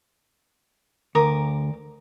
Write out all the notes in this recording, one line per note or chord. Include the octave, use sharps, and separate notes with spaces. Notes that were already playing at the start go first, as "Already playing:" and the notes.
D2 A#4 D6 D#6